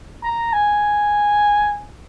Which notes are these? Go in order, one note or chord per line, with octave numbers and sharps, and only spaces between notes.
A#5
G#5